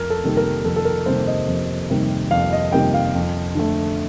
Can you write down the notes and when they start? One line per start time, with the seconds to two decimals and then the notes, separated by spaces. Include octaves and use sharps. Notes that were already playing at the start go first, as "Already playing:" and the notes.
Already playing: F2 A#4
0.10 A4
0.24 C3 D#3 G3 A#3
0.37 A#4
0.64 F2 A4
0.76 A4
0.85 A#4
1.06 C3 D#3 G3 A#3 C5
1.27 D#5
1.48 F2
1.90 C3 D#3 G3 A#3
2.31 F2 F5
2.53 D#5
2.72 C3 D#3 G3 A#3 G5
2.94 F5
3.15 F2
3.55 D3 A3